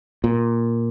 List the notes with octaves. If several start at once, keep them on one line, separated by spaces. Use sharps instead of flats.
A#2